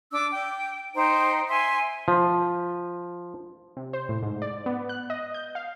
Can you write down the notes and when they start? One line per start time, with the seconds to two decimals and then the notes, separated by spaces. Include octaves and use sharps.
0.12 D4 D6 E6
0.32 G5
0.95 D#4 C5 G5 A#5
1.49 E5 G#5 C6
2.08 F3
3.77 C3
3.93 C5
4.09 A2
4.23 G#2
4.42 D5
4.66 B3
4.89 F#6
5.10 D#5
5.34 G6
5.55 F5